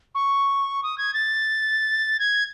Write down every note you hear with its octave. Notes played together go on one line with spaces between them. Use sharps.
C#6
D#6
G#6
A6
G#6